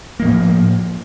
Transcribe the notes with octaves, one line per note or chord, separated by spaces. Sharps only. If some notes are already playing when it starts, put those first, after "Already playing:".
A2 F3 A#3